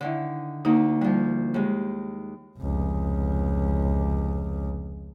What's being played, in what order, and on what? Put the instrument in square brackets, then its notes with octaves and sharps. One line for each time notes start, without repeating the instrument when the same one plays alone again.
[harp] D3 D#3 E4
[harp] D2 A#3 [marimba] D#4
[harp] F3 D4 [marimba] G3
[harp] D#2 G#3
[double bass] F1 C#2